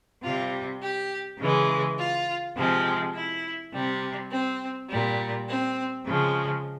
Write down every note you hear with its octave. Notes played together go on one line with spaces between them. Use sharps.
C3 G3 F4
G4
C#3 E3 G#3
F4
C3 F3 G#3
E4
C3 G3
C4
A#2 G3
C4
C#3 F3 G#3